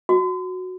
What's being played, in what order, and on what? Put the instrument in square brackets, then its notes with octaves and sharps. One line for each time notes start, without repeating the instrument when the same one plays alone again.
[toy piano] F#4